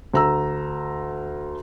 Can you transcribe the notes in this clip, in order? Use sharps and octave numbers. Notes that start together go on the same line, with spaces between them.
D2 A#5 E6